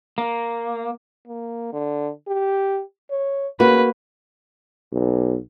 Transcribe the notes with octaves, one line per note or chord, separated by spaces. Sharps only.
A#3
A#3
D3
G4
C#5
C#3 A#3 F#4 B4
B1